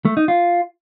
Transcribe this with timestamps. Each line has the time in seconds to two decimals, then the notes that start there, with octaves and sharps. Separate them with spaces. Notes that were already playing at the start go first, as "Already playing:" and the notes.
0.05 A3
0.17 D#4
0.28 F4